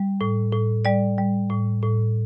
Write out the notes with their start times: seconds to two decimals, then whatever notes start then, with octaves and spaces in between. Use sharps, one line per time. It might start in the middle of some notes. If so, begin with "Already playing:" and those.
Already playing: G3
0.21 A2
0.52 A2
0.85 G3 D5
1.18 G3
1.50 A2
1.83 A2